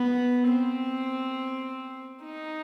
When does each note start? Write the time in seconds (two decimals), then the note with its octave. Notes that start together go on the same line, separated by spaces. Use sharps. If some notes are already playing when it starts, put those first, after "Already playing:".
Already playing: B3
0.48 C4
2.23 D#4